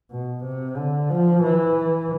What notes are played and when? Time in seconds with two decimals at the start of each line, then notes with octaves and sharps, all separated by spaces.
0.11 B2
0.44 C3
0.77 D3
1.09 F3
1.43 E3